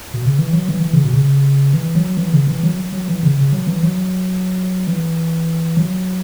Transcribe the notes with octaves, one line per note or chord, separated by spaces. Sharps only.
B2
C#3
E3
F#3
E3
E3
C#3
B2
C#3
E3
F#3
E3
C#3
E3
F#3
F#3
E3
C#3
C#3
F#3
E3
F#3
E3
F#3